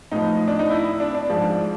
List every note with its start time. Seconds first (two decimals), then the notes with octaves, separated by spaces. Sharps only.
0.11 A2 F3 D#4
0.48 D4
0.59 D#4
0.70 E4
1.00 D4
1.14 D4
1.30 G#2 F3